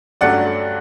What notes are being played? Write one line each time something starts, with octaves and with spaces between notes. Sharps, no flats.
G2 F#3 A3 C#4 D5 F#5